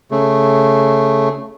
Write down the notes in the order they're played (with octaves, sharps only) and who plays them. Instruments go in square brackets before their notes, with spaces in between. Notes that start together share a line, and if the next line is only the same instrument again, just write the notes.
[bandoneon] C#3 A3